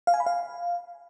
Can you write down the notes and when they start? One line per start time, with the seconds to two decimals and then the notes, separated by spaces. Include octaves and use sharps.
0.07 F5
0.14 G#5
0.20 B5
0.26 F5